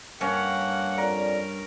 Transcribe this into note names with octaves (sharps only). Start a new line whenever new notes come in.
G2 A#3 C#4 F#5
F2 A#4 D5